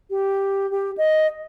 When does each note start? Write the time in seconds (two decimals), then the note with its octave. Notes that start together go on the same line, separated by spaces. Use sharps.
0.10 G4
0.71 G4
0.98 D#5